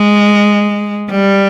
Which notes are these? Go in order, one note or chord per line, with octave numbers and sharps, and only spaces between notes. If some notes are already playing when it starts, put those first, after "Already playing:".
Already playing: G#3
G3